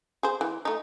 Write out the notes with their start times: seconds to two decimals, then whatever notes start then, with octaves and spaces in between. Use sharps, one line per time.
0.23 G#4 C5
0.41 E3
0.65 A3 D#4